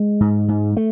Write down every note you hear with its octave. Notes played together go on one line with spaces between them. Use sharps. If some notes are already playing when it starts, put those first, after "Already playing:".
Already playing: G#3
G#2
G#2
A3